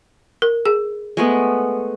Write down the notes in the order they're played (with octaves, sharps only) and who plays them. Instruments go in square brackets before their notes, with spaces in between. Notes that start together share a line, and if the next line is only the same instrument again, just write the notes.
[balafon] A#4
G#4
[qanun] G#3 A3 B3